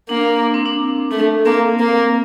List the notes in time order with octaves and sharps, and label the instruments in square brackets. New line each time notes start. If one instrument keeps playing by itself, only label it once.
[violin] A#3 [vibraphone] D4
[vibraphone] D4
D4
C4
D4
[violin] A3 [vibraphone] D4
[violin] A#3 [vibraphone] C4
[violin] A#3